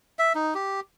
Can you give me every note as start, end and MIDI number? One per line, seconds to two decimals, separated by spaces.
0.19 0.33 76
0.35 0.54 63
0.55 0.80 67